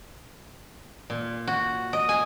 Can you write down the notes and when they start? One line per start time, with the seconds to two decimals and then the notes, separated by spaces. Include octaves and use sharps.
1.10 A#2
1.47 F#4
1.93 D#5
2.09 G#5